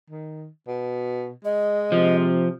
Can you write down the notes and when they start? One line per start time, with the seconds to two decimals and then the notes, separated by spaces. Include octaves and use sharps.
0.10 D#3
0.68 B2
1.45 G#3 D#5
1.92 C3 F3